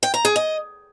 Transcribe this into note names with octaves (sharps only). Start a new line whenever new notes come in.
G5
A#5
G#4
D#5